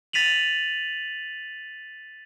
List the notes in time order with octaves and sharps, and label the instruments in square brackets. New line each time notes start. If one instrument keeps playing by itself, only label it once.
[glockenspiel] A6 B6 D#7 F7 F#7